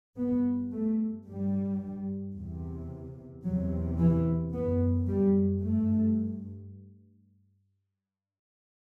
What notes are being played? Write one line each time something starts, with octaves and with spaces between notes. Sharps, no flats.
G2 B3
A3
G2 G3
E2 C3
E2 C3 F#3
E3
F#2 B3
G3
G2 A3